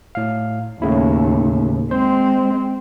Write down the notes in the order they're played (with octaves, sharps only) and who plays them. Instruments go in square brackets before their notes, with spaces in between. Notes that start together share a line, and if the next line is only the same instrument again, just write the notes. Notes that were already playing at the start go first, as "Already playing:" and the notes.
[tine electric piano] A2 F5
[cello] D#2 [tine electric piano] A2 C#3 E4
[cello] G#3 C4 [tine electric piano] C5